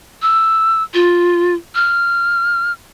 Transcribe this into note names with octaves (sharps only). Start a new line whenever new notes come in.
E6
F4
F6